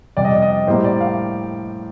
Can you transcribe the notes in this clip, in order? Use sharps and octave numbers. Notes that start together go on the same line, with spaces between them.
F2 C3 G3 D5
D#5
D5
D#5
A2 G3 A#3 C5
D5
F5